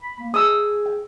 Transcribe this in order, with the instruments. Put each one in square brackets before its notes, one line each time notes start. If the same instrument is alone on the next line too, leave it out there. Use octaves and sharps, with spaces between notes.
[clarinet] B5
A#3
[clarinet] G#4 [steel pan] D#6 E6
[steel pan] G5